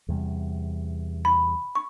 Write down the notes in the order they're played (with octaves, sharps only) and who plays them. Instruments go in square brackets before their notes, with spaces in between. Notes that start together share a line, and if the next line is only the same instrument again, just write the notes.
[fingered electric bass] E2 C3 G3
[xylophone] B5
C#6